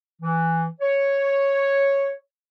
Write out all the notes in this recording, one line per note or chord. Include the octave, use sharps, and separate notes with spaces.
E3
C#5